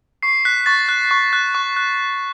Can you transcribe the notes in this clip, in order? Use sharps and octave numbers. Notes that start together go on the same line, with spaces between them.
C#6 C7
F#6 B6
C#6 A6
F#6
C#6
F#6
C#6
F#6